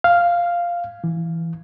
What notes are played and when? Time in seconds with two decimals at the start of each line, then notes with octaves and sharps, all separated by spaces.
0.04 F5
1.04 E3